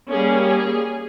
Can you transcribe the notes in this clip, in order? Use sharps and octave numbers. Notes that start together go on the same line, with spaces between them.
G3 A#3 C#4 G#4
G#4